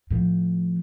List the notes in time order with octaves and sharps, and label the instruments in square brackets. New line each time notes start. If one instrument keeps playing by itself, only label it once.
[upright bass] A2 F3